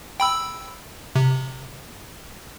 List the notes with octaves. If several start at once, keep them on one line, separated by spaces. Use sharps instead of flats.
G5 B5 E6
C3